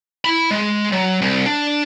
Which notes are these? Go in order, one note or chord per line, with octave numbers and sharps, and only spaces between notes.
E4 B5
G#3
F#3
C2
D4